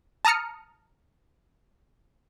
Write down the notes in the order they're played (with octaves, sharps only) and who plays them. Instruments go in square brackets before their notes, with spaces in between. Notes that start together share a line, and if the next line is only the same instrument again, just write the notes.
[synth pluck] A5 A#5 D#6 F6 C#7